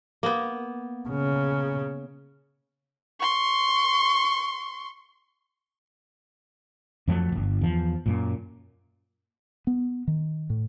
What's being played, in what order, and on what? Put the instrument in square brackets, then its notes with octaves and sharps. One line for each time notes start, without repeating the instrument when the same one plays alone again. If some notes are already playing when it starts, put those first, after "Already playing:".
[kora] A#3 B3
[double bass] C#3
[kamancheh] C6 C#6
[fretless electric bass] F2 F3 F#3 A3
D1 G1
E2 F3
F#2 A#2
[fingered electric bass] B3
D#3
A2